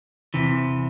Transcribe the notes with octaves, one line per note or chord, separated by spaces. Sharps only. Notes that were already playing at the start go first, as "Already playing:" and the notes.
E2 C3 E3